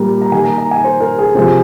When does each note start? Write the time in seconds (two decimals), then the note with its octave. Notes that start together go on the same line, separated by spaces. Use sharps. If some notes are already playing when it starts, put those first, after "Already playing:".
Already playing: A#2 G3 A#3 A#5
0.22 A#5
0.32 D#3 A#3 G#5
0.45 A#5
0.58 A#5
0.71 G#5
0.84 C5
1.00 A#4
1.19 G#4
1.35 C3 F3 G#3 C4